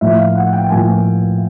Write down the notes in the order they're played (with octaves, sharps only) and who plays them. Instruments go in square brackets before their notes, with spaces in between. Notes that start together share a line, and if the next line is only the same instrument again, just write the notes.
[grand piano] A2 F3 A#3 E5
F5
F#5
G5
A2 F3 A#3 G#5